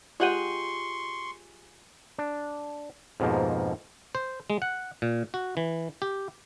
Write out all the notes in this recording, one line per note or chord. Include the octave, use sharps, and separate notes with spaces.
G#3 F4 G4 F#5 G5 C6 C#6 D#7
D4
F2 G#2 B2 F3 A#3
C5
G#3
F#5
A#2
F#4
E3
G4